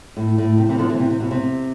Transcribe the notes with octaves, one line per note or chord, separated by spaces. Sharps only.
A2
A2
C3
C3 E3
D3 F3
C3 E3
C3
C3
B2
C3